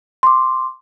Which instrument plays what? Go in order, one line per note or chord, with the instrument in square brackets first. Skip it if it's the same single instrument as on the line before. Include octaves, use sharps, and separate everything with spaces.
[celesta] C6 D6